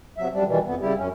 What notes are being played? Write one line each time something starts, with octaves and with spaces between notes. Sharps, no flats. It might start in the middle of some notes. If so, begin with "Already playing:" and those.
C3 F#3 E5
F#2 G3 D4
B2 D#3 E3 G3
F2 B3
C#3 G3 E4 G4
F#2 C#4